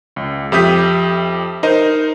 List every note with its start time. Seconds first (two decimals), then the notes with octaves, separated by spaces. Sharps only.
0.16 C#2
0.52 F2 G4 E5 D#6 G6 B6
1.63 D#4 A#4 C5 D#5